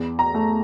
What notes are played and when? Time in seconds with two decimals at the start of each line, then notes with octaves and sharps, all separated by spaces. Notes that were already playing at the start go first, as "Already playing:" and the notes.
Already playing: E2
0.19 A#5
0.34 A3